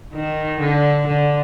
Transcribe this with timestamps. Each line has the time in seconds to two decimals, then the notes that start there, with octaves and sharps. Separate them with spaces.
0.14 D#3
0.60 D3
1.07 D3